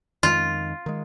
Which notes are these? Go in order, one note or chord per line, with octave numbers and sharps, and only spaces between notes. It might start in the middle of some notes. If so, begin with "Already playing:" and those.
F2 D#3 G#3 F4
D#3 G#3